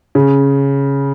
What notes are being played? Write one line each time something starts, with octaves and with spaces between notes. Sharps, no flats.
C#3